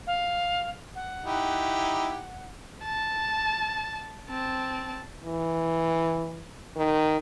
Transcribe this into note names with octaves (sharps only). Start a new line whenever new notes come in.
F5
F#5
D#4 E4 G4
A5
C4 A5
E3
D#3